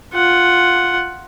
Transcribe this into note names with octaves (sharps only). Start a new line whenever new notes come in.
F4 F#5